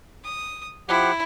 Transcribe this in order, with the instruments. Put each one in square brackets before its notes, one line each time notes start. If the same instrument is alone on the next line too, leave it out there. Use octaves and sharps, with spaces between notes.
[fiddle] D#6
[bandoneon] F3 G4 F#5 [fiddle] E4